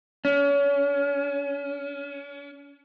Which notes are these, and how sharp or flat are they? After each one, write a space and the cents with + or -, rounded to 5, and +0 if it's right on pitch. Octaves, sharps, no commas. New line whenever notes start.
C#4 +30